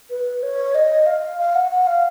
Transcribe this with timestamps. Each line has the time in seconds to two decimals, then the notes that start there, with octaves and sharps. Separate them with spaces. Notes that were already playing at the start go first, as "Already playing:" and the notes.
0.10 B4
0.42 C#5
0.74 D#5
1.06 F5
1.38 F5
1.54 F#5
1.71 F#5
1.87 F5